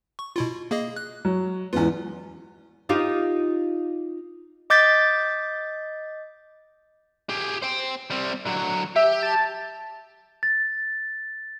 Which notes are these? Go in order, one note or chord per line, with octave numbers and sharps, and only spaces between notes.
C#6
B2 E4 F4
A#3 G#4 D#5
F#6
F#3
E2 G#2 B3 C#4 F4
D#4 F4 G4
D#5 D6 G6 A6 B6
G4 G#4
C5 G5
G3 C4
D3 F#3
G4 E5
A5
A6